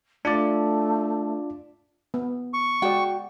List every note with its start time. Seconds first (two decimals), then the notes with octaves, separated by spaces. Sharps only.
0.25 A3 D4 F4 D5
2.14 B3
2.53 C#6
2.82 G#3 F#4 D5 G5